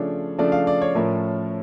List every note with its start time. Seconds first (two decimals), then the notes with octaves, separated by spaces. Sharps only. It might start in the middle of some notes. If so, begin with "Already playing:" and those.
Already playing: C#3 F3 A3 D4 C#5
0.38 C#3 F3 A3 D4 D5
0.52 F5
0.67 D5
0.82 C#5
0.95 A2 F3 C#4 A#4